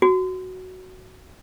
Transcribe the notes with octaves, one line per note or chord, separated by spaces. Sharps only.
F#4